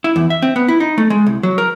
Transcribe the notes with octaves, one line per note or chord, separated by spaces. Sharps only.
E4
E2
E5
C4
B3
E4
D#4
A3
G#3
C2
F#3
A#4